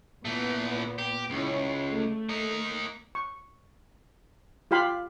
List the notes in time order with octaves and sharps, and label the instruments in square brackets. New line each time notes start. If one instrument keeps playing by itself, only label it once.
[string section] A#2 B3 [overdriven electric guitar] E3 A3
[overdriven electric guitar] G4
[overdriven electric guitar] C#2 [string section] C#3 C#4 E4
[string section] A3
[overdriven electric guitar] A#3 D#5
[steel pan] C#6
F4 G4 F5 B5 C6